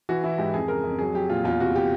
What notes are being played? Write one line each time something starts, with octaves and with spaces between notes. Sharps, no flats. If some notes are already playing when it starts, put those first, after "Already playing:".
E3 F#4
E3 E4
G#2 G4
F2 G#4
C#3 A#4
F2
F#3 G#4
F#3 G4
A#2 F4
E2 F4
C3 F#4
G4